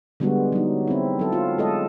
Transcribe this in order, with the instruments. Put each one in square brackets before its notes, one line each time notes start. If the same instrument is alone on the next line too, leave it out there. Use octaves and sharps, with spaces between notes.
[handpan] D3 G3 G#3 B3 F#4
F#3 D#4
C4 E4
F#3 A4
F4
G#3 A4 D#5